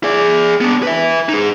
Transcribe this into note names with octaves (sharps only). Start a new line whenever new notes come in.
G#4 D5
B3 D4
B4 E5
D#4 G#4